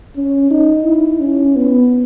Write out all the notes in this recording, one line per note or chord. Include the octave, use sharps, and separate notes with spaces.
C#4
D#4
E4
C#4
B3